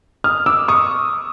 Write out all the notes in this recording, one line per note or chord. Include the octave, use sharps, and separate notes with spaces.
D#6 F6
D6 E6
C#6 D#6